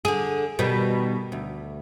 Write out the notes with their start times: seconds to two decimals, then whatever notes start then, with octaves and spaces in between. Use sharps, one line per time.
0.05 D3 G#4
0.59 B2 D#3 G3
1.32 D2